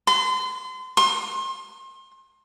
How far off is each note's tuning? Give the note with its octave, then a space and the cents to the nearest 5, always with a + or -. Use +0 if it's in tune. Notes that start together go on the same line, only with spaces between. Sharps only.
C6 -35
C6 +30